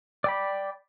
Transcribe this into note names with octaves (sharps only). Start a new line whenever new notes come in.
D5 G5 B5